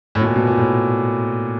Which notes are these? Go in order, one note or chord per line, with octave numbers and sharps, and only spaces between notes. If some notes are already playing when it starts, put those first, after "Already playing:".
A2
B2
A#2
B2
A#2
A2